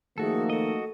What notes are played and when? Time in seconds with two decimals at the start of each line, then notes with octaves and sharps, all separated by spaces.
0.18 D#3 F3 A3 A#3 F#4 G#4 A4
0.50 F#4 A4 D#5